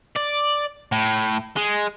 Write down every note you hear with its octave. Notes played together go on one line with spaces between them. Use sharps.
D5
A2
G#3